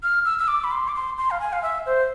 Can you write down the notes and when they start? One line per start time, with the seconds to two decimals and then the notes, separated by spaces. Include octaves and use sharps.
0.03 F6
0.25 E6
0.39 E6
0.48 D6
0.64 B5
0.71 C6
0.88 D6
0.95 C6
1.18 C6
1.31 F5
1.40 G#5
1.53 F5
1.63 E5
1.86 C5